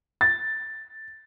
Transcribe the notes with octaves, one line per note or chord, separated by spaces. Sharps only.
A6